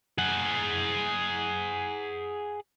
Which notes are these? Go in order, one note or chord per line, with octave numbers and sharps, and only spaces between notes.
G#4 F#5